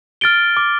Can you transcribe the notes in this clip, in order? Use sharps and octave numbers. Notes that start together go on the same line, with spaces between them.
F6 A6 D7 G7
D6